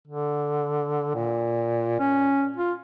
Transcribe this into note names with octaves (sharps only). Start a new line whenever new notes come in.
D3
A#2
C#4
F4